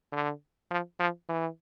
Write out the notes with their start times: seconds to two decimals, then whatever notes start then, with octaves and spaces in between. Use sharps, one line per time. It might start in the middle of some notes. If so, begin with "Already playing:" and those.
0.13 D3
0.71 F3
1.00 F3
1.29 E3